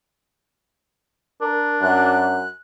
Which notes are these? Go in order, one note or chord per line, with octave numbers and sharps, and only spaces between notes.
D4 A#4
F#2 F#6